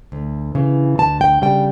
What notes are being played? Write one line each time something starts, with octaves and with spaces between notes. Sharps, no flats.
D2
C#3 E3
D2 A5
G5
C#3 G3 G5